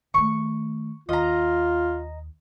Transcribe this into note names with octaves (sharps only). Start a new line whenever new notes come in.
D#3 A3 C#6
D#2 F4 D#5 A#5